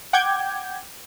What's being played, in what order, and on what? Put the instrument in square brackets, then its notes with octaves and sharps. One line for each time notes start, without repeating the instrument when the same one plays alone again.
[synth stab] F#5 G5 D6 G6 G#6